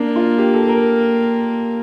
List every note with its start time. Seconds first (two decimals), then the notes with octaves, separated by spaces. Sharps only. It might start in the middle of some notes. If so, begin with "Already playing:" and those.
Already playing: A#3 D4
0.16 F4
0.38 G4
0.54 A4
0.69 A#4